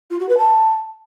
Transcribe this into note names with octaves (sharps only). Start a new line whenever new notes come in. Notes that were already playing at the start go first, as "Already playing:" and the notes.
F4
F#4
B4
A5